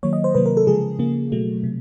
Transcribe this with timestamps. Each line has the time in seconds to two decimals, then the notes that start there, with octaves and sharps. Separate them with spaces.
0.03 D#3 F#3 A#3 C#5
0.13 D#5
0.24 C5
0.35 C3 D#3 F#3 A#3 B4
0.46 A#4
0.57 A4
0.67 C#3 F3 G#3 G#4
0.99 C#3 F3 A#3
1.32 B2 F#3 A3
1.64 C3